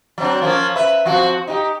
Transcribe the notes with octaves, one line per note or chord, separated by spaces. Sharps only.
F#3 C4 D4
F3 A#3 C#4
B4 E5
F3 C4 F#4
D#4 G4